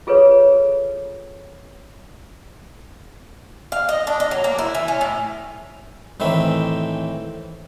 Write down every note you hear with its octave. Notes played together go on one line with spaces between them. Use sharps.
F4 G#4 A4 B4 C#5
F5
D#5
D4
D#5
F#3
A#3
E4
E3
C#4
A2
A2 D#3 E3 C4 E5